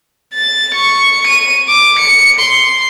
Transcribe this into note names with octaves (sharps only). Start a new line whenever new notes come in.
A6
C#6
D#7
D6
C#7
C6